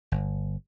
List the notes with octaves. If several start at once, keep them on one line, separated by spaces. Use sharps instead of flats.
G1